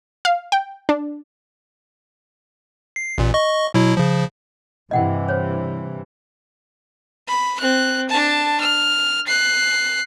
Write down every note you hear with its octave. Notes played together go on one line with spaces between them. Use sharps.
F5
G5
D4
C7
A1 A#2
D#5 C#6
B2 F#3 E4
C#3 F3
G2 C3 E3 D#5 F#5 G5
C5 C#5
B5
C4 F#6
D4 A5
F6
F#6 C7